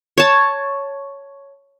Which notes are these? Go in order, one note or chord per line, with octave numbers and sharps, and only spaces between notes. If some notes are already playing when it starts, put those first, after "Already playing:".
C#5 A5